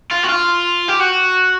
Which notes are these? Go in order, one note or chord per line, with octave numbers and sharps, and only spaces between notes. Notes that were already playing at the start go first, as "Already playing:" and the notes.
F4
F#4
F4
G4
F#4